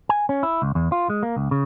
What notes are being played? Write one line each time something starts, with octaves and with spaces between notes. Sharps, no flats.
G#5
C#4
E4
C#2
E2
F4
G#3
A#3
C#2
C#3